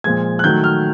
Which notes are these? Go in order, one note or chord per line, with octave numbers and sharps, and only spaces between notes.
A#2 F3 G#3 G#6
F#6
D#3 F#3 A3 G6
F6